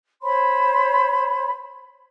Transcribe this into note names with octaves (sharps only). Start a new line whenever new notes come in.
C5 C#5 B5 C6